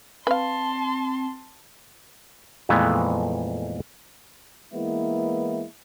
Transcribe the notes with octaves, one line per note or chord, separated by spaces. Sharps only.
C4 B4 F5 A5 C6
F2 A#2 E3 G#3 A3 B3
E3 G#3 A#3 B3 E4